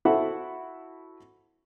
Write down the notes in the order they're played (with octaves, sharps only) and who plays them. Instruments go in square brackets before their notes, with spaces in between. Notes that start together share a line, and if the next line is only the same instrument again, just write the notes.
[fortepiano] E4 F#4 A4 C5 E5 F#5